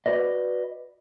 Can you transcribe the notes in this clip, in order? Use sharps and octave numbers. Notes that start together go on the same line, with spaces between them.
F#4 B4 D5 D#5